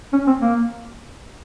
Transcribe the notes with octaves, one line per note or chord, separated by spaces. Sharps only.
C#4
C4
A#3